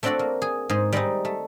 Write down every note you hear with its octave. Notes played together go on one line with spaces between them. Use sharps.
A3 C4 D4 F#4 A4 D5
A#3
G#4
G#2 G#4 C5
G3 G#3 C4 D#4
A3